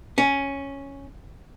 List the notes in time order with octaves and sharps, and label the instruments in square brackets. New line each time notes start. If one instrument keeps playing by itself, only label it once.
[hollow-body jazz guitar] C#4